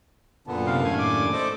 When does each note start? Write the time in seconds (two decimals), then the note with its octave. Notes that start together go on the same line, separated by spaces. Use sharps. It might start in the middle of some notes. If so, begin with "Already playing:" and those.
0.47 F#2 A#2 D3 B3 D4 A5
0.67 C3 F5
0.85 D#2 A2 G#5
0.99 D6
1.33 A3 C5 D5 D#5